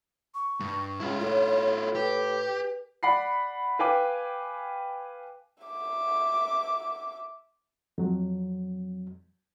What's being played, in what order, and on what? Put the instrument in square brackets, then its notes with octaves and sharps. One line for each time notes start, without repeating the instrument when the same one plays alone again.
[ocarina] C#6
[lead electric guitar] G2
[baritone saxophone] C#2 [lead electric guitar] E4 F4
[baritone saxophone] A2 [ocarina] C#5
[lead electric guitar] G4 [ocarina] B4
[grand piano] D5 F#5 B5 C7
B4 F5 G5 G#5 D6
[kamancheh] E5 D6
[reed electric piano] F2 F#3